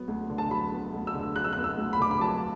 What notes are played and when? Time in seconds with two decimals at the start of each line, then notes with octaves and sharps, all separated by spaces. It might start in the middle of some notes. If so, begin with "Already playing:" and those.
Already playing: F#3 B3
0.08 D2
0.30 D3
0.38 A5
0.51 F#3 B5
0.72 B3
0.93 D2
1.07 E6
1.15 D3
1.36 F#3 F#6
1.44 E6
1.53 B3 F#6
1.64 E6
1.78 D2
1.93 B5
1.99 D3 D6
2.11 B5
2.20 F#3 A5